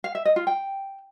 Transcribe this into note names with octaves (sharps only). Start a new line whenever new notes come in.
F5
E5
D#5
F4
G5